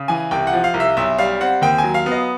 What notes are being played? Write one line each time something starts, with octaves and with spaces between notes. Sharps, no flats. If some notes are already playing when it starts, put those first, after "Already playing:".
Already playing: C#3
E3 G#5
C2 G5
F#5
F3
F5
C2
E5
B1 E5
G3 F5
C4 F#5
D#2 G5
G#5
F#3
F5
B3
D#5